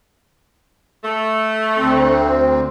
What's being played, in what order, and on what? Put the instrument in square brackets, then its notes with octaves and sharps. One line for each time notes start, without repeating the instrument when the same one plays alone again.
[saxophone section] A3
[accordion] D2 C4